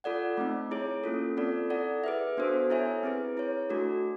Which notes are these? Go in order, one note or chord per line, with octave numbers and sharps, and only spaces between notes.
F4 A4 D5 F#5
A3 C4 D#4
E4 G#4 C#5
A#3 C#4 F4 A4
C4 F4 A4 D5
E4 A4 D5 F#5
G#4 B4 E5
B3 D4 F#4 A4 C5
E4 A4 C#5 E5 G#5
C4 E4 G#4 B4
E4 G#4 C#5
A3 D4 F#4 A4